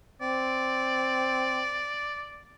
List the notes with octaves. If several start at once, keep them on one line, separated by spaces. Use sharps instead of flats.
C4 D5